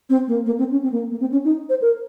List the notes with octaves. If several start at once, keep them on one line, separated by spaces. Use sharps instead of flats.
C4
A#3
A#3
C4
C#4
C4
A#3
A#3
C4
C#4
D#4
C5
A#4